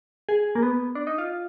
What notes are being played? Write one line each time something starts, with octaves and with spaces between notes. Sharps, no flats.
G#4
A#3
B3
D4
D#4
F4